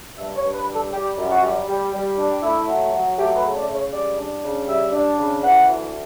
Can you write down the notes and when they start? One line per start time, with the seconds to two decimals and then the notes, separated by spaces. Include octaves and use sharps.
0.17 G2 E5
0.36 C#5
0.43 G2
0.55 B4
0.67 G3
0.74 A4
0.92 G3 G4
1.17 F#2
1.30 F#4
1.43 G3
1.67 G3
1.92 G3
2.17 D4
2.42 A3 E4
2.67 F#3
2.92 F#3
3.17 A3 G4
3.36 B4
3.42 C#3
3.55 D5
3.67 C#3
3.73 C#5
3.92 G3 D5
4.17 D4
4.42 C#3
4.67 G3 E5
4.92 D4
5.16 C#3
5.42 E3 F#5
5.67 D2